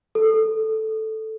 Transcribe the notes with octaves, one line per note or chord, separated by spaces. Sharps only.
A4